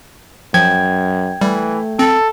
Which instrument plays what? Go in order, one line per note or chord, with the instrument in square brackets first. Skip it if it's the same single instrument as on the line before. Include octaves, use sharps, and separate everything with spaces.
[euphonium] F#2 [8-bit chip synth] F3 [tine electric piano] G5 G#6
[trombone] E3 [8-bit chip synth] G3 [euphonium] A3
[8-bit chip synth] C4 [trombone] A4